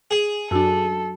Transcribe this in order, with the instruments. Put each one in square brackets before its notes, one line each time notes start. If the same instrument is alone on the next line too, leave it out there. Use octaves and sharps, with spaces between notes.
[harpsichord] G#4
[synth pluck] F#2 D4 [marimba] F#3 F#4 E6 [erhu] A4